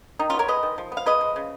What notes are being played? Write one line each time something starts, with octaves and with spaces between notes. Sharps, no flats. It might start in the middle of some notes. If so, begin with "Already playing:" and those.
D#3 D#4
C#4 F4
B3
A#4 C#5
G#3 B4 D#5
D#3
F3
B3
F5
G#3 B4 D#5
F3
C#3